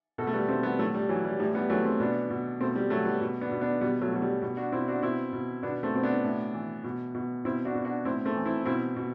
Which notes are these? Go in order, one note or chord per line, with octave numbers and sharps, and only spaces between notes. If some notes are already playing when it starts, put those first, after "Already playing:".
B2 F#4 A4
A3
G3 B3
B2 A3 C4
G3 B3
A2 F#3 A3
G3
E3 F#3
G3
A2 G3
G3 B3
E3 F#3 A3
A3 C4
B2 B3 D4
B2
B2 A3 C4
G3
B2 F#3 A3
G3 B3
B2
B3 D4
B2
B3 D4
B2 G3 B3
F#3 A3
B2 F#3
G3
B2
D4 F#4
B2 C4 E4
D4 F#4
B2 C4 E4
B2
B2 B3 D4
A3 C4
B2 C4
B3 D4
A2
E3
B2
B2
B2 C4 E4
D4 F#4
B2
D4 F#4
A2 C4 E4
A3 C4
E3
C4 E4
B2 C4 E4
B2